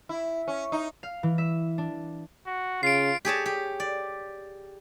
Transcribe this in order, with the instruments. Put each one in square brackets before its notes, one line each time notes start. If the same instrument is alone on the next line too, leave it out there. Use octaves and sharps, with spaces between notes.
[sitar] E4
C#4
D#4
[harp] F5
E3
E5
D4
[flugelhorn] F#4
[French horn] C#3 [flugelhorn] F4 [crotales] C7 D7
[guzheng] G4 G#4 C#5 A5
G4
D5